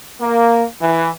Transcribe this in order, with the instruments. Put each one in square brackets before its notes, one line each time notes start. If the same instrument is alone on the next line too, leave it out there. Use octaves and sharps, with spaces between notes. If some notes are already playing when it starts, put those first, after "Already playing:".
[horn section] A#3
E3